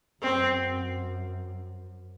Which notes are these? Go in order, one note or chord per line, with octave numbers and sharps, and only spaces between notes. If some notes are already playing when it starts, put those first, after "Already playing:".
F#2 C4